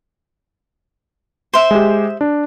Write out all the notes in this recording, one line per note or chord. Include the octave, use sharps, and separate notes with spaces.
C5 E5
G#3 G4
D4